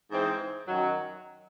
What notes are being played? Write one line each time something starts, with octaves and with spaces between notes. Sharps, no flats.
G#2 E3 G#3 C4
F#2 D#3 F#3